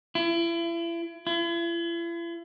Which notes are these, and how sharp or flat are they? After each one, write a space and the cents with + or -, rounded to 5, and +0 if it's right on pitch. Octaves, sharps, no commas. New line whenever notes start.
E4 +35
E4 +45